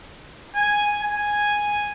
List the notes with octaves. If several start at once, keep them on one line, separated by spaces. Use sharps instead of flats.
G#5
G#5